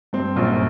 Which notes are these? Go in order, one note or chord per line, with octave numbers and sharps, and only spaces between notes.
G2 C4
A#1 F#2